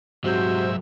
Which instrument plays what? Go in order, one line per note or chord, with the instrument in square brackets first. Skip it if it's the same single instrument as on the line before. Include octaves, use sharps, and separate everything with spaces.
[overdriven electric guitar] C2 F#3 [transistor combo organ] G#2 E5 [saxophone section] C3 C5 [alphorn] F#4